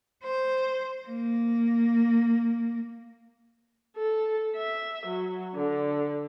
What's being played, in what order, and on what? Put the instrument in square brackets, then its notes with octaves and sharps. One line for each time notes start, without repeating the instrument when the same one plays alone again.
[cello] C5
A#3
[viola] A4
E5
F#3
D3